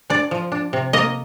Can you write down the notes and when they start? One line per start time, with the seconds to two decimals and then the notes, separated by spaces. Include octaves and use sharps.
0.10 D4 D5
0.31 F3
0.52 D4
0.73 C3
0.93 A#3 D#5